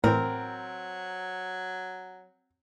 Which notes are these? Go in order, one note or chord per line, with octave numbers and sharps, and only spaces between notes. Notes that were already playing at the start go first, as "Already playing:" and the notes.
A2 E3 F#3 C4 A#4